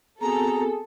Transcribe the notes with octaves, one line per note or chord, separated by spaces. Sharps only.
B3 C4 F#4 G#4 A4 A#5